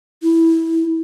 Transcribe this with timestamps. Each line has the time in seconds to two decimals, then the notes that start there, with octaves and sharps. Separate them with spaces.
0.23 E4